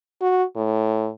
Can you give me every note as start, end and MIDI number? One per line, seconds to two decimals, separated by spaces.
0.21 0.44 66
0.56 1.09 45